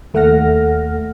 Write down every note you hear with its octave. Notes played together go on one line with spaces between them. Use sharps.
D#2 A3 A4 F#5 F6 A#6